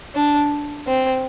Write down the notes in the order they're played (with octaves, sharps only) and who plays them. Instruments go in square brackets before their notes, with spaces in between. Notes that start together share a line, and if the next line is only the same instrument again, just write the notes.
[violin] D4
C4